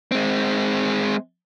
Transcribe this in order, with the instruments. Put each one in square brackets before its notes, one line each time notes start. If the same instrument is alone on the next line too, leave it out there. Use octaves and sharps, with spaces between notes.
[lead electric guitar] G#3 C4